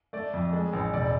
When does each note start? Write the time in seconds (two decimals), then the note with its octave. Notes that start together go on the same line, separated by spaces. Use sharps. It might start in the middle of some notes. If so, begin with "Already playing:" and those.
0.13 A3 D5
0.34 F2
0.53 G#3
0.73 A1
0.94 E1 D5